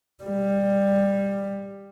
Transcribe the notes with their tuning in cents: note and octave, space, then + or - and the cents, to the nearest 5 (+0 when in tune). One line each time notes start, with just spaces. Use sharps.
G3 +15